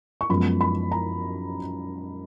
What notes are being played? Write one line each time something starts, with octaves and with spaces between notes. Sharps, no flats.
C#6
F#2 F3 G#3 B3 B5
B5
A#5